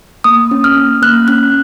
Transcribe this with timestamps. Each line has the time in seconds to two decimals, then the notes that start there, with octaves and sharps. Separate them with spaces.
0.24 A#3 D#6
0.51 C#4
0.64 F6
0.77 A#3
1.02 A#3 F#6
1.28 C#4 F#6